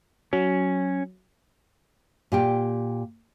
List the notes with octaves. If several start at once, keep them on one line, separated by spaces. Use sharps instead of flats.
F#3 C#4
A#2 G4 G5